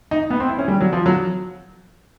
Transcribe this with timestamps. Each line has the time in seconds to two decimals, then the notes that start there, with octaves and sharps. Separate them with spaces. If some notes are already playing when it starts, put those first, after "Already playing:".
0.11 D#4
0.30 B3
0.40 C4
0.49 E4
0.58 C#4
0.68 G3
0.81 F#3
0.93 F3
1.06 F#3